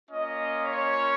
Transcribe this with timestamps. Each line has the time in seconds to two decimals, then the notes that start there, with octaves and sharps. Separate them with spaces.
0.10 A#3 C#4 F4 D#5
0.61 C#5